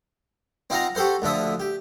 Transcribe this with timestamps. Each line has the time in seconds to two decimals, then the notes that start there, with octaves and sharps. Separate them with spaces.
0.70 C4 D#4 F4 F5 F#5 A#5
0.95 F#4 G4 A4 C5 F#5
1.22 D2 D3 F3 E5 D#6
1.60 G4